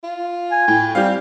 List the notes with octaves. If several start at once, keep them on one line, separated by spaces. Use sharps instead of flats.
F4
G#5
A2 G5
G3 C4 G4 F5